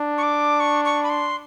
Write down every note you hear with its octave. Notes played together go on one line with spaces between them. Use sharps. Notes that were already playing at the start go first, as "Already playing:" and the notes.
Already playing: D4
C#6
D6
C#6
C#6
B5
C6